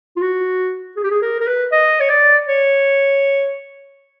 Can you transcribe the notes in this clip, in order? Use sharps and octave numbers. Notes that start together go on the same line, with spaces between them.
F4
F#4
G#4
G4
G#4
A#4
A#4
B4
D#5
C#5
D5
C#5